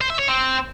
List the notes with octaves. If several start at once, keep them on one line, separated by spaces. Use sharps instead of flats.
C5
E5
C#5
C4